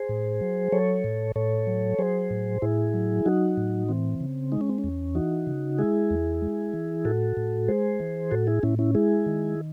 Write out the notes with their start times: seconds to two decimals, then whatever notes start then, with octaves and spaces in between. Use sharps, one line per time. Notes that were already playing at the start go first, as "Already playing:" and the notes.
Already playing: G#4 C5
0.09 A2
0.41 F#3
0.72 F#3 A4 C#5
1.04 A2
1.36 A2 A4 C#5
1.67 F#3
1.99 F#3 G#4 C5
2.31 A2
2.62 A2 E4 G#4
2.94 F#3
3.25 F#3 D#4 F#4
3.57 A2
3.88 E3 C4
4.21 C#3
4.52 G#3 D#4
4.61 C#4
4.69 C4
4.78 C#4
4.84 E2
5.15 E3 D#4 F#4
5.47 C#3
5.79 G#3 E4 G#4
6.10 E2
6.42 G#3
6.74 E3
7.05 A2 F#4 A4
7.37 A2
7.68 G#3 G#4 C5
8.00 E3
8.31 A2 F#4 A4
8.47 E4 G#4
8.63 A2 C#4 E4
8.79 C#4 E4
8.95 G#3 E4 G#4
9.26 D#3